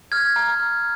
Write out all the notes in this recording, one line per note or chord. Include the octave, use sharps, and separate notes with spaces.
F6 G#6
A#5
F6